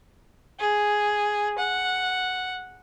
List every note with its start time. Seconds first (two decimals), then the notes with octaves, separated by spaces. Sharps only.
0.59 G#4
1.59 F#5